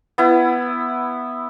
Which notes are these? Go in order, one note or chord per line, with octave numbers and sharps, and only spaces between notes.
B3 E4